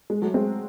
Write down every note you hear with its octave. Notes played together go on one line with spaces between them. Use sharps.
G#3
F#3 A3
G#3 C4